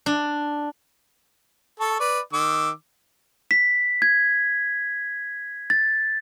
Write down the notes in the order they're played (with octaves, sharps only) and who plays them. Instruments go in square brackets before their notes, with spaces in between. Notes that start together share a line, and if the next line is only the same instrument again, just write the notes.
[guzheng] D4
[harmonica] A4 A5 C#6
B4 D5
D#3 D6 E6
[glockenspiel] B6
G#6
A6